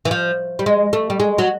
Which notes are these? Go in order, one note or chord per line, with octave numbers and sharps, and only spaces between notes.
E3
F3
G3
G#3
A3
G3
G#3
F#3